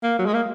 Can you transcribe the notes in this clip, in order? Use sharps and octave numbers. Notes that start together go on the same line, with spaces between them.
A#3
F#3
G#3
A#3